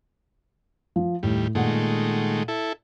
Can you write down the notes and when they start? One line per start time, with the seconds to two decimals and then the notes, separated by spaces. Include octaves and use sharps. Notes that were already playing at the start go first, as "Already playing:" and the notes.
0.96 F3
1.23 D#2 A2 G3
1.55 A#2 D#3 G#3 A3 F#5
2.48 E4 A4